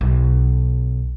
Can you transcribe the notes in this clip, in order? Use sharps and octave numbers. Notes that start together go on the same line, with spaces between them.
B1